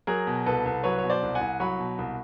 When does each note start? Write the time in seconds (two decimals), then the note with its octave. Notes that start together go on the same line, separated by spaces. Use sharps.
0.07 F#3 G#4 A#4
0.27 B2
0.46 C2 A4 B4
0.66 C2
0.84 F#3 B4 C#5
0.98 C#5
1.04 B2
1.10 C5 D5
1.23 C2
1.35 F#5 G#5
1.41 C2
1.60 F#3 B5 C#6
1.79 B2
1.98 C2